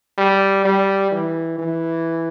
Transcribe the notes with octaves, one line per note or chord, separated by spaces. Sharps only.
G3
G3
E3
E3